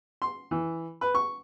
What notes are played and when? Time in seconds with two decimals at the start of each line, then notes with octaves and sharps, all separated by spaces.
0.22 C6
0.51 E3
1.01 B4
1.15 C#6